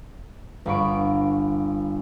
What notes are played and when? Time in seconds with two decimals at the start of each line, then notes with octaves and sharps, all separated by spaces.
0.66 G1 F5 B5 C#6 D7